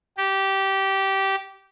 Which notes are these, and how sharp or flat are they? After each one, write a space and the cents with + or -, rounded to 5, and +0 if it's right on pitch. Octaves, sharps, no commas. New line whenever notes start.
G4 -15